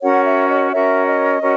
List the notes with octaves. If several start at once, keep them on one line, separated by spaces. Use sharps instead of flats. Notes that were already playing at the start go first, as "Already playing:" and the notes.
C#4 F#4 A#4 C#5 F#5
E5
D#5
C#4 F#4 A#4 C#5 E5
D#5
C#4 F#4 A#4 C#5